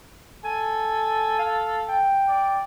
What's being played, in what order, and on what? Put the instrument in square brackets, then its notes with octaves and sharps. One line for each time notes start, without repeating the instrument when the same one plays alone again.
[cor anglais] A4 [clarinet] G#5
[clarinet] F5
G5
[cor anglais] D5